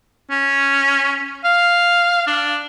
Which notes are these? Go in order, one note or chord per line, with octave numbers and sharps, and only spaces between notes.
C#4
F5
D4